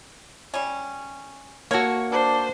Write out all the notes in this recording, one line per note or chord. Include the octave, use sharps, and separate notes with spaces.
G3 C#4
A#3 F#4 A4 C#5
D4 C5